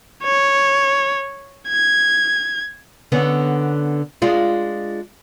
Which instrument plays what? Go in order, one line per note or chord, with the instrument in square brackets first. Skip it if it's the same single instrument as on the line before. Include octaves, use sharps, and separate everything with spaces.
[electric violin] C#5
G#6
[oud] D3 B3 C#4
G#3 D4 F4